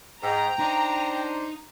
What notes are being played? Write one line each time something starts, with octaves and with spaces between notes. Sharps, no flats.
G#2 G5 A#5
D4 D#4 C5